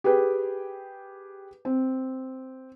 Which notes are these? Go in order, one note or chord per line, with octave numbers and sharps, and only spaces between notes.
G4 G#4 B4 G5
C4